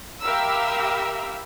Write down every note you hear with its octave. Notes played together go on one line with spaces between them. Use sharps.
G4 A#4 E5 F5 B5 E6